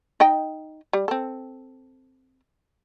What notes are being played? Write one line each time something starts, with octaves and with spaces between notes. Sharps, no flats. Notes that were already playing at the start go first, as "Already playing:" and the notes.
D#4 D#5 G5
G3
C4 A4